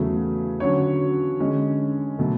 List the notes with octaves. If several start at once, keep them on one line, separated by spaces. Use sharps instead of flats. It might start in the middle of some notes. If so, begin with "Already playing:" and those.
Already playing: E2 C#3 F#3 A3
D3 F#3 C#4 F#4 C#5
D3 G#3 C#4
B2 F#3 A3